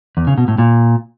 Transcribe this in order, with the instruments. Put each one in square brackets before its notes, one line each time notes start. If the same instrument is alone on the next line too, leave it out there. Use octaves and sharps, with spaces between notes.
[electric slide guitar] E2
C#3
B2
A2
A#2